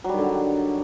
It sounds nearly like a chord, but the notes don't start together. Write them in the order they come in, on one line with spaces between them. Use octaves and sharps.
F#3 G3 D#3 D3